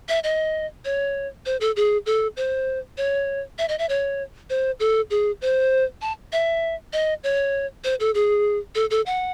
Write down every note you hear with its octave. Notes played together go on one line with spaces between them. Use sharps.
E5
D#5
C#5
C5
A4
G#4
A4
C5
C#5
E5
D#5
E5
C#5
C5
A4
G#4
C5
A5
E5
D#5
C#5
C5
A4
G#4
A4
A4
F#5